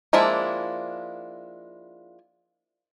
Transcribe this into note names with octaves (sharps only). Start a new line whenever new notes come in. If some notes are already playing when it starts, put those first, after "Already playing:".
F3 G#3 A#3 D4 E4